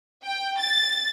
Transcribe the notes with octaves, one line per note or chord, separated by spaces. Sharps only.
G5
A6